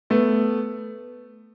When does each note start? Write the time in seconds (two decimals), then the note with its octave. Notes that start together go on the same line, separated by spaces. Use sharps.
0.10 A3 B3